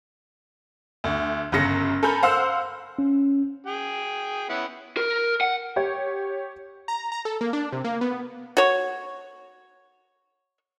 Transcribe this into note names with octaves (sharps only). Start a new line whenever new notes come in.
D2
G1 F#2 C#3 A#6 C#7
A4 A#4 G#5 A#5 B5 G6
C5 F5 F#5 E6
C#4
G#4 G5
B3 C#4 E4
A#4
F#5
G4 C#5
A#5
A#5
A4
A#3
D4
C3
A#3
B3
F#4 C#5